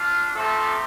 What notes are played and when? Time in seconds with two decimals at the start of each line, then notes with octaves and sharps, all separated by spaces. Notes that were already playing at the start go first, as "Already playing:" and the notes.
Already playing: D4 F4
0.35 C3 F3 A3 F4 A4